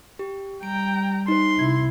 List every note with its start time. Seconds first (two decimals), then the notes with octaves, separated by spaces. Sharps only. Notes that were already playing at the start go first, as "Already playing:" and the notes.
0.19 G4
0.63 G3 G5 A#5 D7
1.28 D#4 C5 C6
1.59 C3 E4 G#6